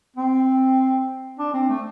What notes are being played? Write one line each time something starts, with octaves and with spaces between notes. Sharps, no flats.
C4
D4
C4
A3